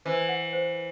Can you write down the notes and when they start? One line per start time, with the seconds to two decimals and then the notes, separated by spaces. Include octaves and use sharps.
0.05 E3 C5
0.29 F#5
0.53 C5